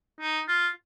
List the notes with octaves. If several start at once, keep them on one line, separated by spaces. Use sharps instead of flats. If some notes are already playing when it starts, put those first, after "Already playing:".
D#4
F4